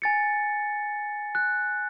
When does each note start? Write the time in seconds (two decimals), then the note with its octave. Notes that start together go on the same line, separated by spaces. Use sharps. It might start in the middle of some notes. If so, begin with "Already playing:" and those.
0.02 G#5 A6 C#7
1.35 F#6